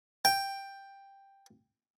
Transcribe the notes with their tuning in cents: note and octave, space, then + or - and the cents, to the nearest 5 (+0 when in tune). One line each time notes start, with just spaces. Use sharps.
G5 +10